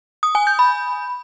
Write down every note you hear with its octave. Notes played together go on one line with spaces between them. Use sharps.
D#6
G#5
G6
B5